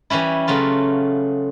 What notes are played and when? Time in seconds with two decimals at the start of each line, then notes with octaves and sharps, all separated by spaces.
0.10 E3 G3 C#4 E4
0.48 C#3 F#3 A3 F4